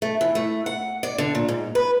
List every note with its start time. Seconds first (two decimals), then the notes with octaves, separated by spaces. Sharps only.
0.02 A3
0.21 E3
0.35 A3
0.66 F#5
1.03 D5
1.18 D3
1.35 A#2
1.49 G#2
1.75 B4